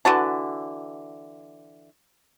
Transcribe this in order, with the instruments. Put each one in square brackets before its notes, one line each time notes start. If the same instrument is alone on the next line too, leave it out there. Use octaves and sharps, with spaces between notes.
[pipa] D3 E3 F#4 A5